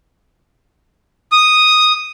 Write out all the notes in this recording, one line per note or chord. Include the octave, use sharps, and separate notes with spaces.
D#6